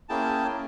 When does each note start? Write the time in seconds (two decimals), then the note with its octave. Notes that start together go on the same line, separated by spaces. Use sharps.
0.09 A#3 C#4 E4 G#4 G5 A5
0.52 A#3 C#4